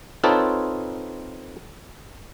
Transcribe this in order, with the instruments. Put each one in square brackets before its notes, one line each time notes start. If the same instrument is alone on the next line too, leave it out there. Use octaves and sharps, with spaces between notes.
[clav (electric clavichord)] C4 D#4 F4 A4 B4 C#5